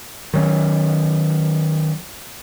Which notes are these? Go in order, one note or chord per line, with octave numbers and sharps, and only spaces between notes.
D#3 F#3 C#4